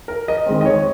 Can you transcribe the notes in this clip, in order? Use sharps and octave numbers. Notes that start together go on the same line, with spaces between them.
A#4
D#5
D#3 G#3 C4
D#5
C#5